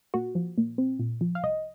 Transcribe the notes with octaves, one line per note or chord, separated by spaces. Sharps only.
A#2 F#4
F3
A#2
C4
A#2
F3
F5
C2 D#5